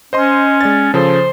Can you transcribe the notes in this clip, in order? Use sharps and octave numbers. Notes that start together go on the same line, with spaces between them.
C#4 C5 D#5 C6
G#3 D5 A6
C#3 F3 A4 C5